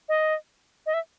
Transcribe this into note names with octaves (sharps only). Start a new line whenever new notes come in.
D#5
D#5
E5